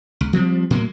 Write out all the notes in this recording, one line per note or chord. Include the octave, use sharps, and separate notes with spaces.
C#2
F3 G3 C4
A2 F#3 A#3